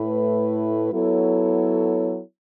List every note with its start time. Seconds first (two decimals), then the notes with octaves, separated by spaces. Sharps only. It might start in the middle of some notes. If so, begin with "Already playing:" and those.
Already playing: A2 A3 E4 B4
0.92 F#3 B3 E4 A4 C#5